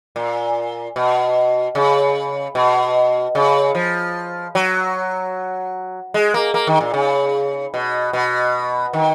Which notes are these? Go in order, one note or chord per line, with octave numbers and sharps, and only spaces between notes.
A#2
B2
C#3
B2
C#3
F3
F#3
G#3
A#3
A#3
D#3
A#2
C#3
B2
B2
D#3